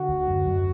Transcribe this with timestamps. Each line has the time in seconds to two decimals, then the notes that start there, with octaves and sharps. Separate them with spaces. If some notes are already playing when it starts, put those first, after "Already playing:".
Already playing: D3 F#4
0.08 D2
0.27 F#2
0.47 F#2